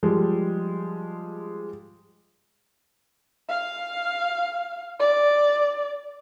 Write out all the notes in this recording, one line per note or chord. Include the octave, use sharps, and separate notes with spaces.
F3 G3 G#3
F5
D5